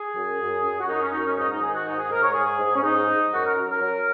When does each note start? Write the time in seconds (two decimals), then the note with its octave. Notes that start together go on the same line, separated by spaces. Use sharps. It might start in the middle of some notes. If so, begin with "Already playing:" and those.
Already playing: G#4
0.15 F#2
0.40 F#2
0.64 F#2
0.80 F#4
0.88 F#2 D#4
1.01 C#4
1.13 F#2 D#4
1.25 C#4
1.37 G#2 D#4
1.50 D#4
1.62 D#3 G#4
1.74 F#4
1.86 G#2 D#4
1.98 G#4
2.10 G#2 A#4
2.22 C#5
2.34 G#2 G#4
2.59 G#2
2.75 C#4
2.83 G#2 D#4
3.08 G#2
3.31 F#2 F#4
3.44 A#4
3.56 F#2
3.69 A#4
3.80 F#3